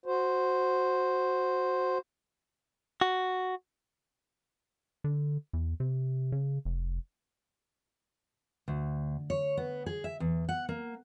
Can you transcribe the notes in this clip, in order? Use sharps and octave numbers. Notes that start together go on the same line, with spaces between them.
F#4 C5
F#4
D3
E2
C3
C#3
F1
D2
C#5
B3
G#4
E5
E2
F#5
A#3